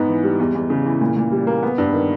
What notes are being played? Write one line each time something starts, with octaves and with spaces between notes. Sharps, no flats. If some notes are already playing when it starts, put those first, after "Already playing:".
Already playing: G#2 B3
E3
G3
E2
E2
C#3
E3
A#2
A#2
G3
A#3
B3
G2
D#3